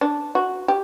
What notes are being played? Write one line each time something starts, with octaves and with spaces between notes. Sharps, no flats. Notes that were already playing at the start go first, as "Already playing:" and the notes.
D4
F#4
G4